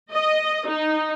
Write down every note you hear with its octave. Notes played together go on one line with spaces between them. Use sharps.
D#5
D#4